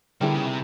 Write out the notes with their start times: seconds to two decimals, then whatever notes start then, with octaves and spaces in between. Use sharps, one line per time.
0.21 D3 D#3 G3 B3 E4 G#4
0.34 C#3
0.45 C3